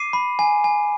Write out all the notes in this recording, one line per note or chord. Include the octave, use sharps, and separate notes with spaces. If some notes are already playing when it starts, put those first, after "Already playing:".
Already playing: D6 C7 D#7
B5
G#5
G#5